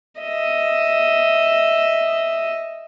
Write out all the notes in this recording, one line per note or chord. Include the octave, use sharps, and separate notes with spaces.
D#5 E5